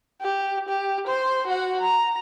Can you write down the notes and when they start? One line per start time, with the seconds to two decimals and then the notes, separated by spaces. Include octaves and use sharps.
0.21 G4
0.68 G4
1.07 C5 C6
1.47 F#4 F#5
1.81 A#5